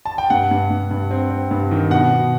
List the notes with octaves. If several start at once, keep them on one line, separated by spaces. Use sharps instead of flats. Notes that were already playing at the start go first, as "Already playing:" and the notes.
A5
G5
G2 F#5
G2
G2
G2
C4
C4
G2
D#3
B2 F#5
B2